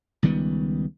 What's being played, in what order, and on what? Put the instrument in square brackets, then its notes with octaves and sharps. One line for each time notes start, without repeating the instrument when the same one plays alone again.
[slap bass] C#2 D#3 G3 B3